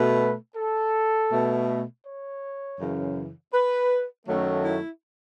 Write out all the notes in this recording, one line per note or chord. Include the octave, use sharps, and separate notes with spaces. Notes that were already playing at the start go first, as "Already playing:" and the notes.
Already playing: B2 A3 B4
A4
B2 A3
C#5
F#2 C#3 E3
B4
F#2 D#3 F#3 A3
E4